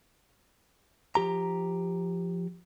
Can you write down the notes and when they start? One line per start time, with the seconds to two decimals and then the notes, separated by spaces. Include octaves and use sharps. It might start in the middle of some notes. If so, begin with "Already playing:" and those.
1.15 F3 G4 A#5